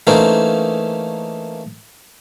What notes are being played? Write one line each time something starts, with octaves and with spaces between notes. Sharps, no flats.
E3 A3 A#3 C#4 D#4 C5